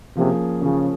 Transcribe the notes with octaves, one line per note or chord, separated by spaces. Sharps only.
C3 F3 A#3 C#4 G#4
C#3 F3 A#3 C#4 G#4